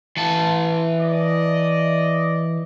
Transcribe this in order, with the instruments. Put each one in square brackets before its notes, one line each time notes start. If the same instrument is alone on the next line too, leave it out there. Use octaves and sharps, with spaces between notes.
[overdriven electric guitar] E3 A5
[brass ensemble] D5 D#5